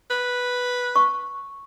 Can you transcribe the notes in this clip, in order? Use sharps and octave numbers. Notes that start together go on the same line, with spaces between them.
B4
C#6